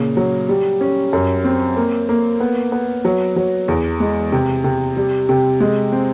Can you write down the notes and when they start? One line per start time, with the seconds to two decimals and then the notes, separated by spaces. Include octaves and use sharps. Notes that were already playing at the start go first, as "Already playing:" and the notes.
Already playing: A#2 C#3
0.17 F#3
0.49 G3
0.81 C#4
1.13 F#2
1.44 C4
1.77 A#3
2.09 A#3
2.40 B3
2.72 B3
3.05 F#3
3.36 F#3
3.68 E2
4.00 G#3
4.32 C3
4.64 C3
4.97 G3
5.29 C3
5.60 G#3
5.92 C4